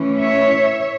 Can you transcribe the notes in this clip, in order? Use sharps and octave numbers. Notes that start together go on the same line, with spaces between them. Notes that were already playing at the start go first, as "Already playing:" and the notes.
Already playing: E3 A3 C#4
C#5 E5